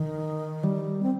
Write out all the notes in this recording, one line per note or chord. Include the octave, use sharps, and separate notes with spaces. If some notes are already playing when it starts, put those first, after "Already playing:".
Already playing: D#3
G3
C4